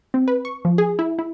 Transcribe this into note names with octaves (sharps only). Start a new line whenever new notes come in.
C4
B4
C#6
F3
G#4
E4
E4